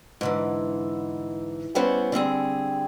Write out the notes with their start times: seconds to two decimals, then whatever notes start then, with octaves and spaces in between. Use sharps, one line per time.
0.21 G#2 D3 E3
1.75 G3 B3 C#4 E4 C5 F#5
2.12 D3 G3 C4 G#4